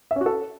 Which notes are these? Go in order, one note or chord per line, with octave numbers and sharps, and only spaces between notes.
E5
C#4
F#4
A4